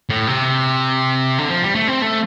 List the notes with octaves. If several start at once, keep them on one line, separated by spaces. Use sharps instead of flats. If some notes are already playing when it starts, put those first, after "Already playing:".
A2
C3
D3
F3
G3
A3
C4
A3